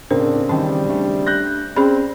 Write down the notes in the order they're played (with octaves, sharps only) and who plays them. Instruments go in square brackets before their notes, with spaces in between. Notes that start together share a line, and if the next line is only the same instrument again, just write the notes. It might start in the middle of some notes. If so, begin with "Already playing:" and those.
[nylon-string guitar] A2 [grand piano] C#3 C4 [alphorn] D4 [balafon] A#4
[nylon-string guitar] D#3 E3 A5 [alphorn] G3 [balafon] C#4
[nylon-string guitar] A3 D4
[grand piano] F#6 G6 A#6
[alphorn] C4 [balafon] C#4 G#4 B5 [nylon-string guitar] D5